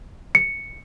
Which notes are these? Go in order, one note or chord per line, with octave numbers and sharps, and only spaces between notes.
C#7